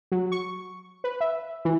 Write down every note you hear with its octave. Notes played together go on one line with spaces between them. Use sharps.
F#3
C#6
B4
E5
E3